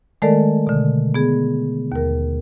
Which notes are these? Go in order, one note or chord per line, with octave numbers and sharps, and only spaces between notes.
D#3 G#3 A3 A4 A#4 D5
B2 D3
B3 G#4
D#2 A#4